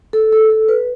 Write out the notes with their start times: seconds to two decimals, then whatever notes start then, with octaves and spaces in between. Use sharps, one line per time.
0.13 A4
0.32 A4
0.50 A4
0.68 B4